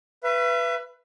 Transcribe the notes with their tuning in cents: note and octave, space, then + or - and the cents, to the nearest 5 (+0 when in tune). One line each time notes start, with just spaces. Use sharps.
B4 +0 E5 +40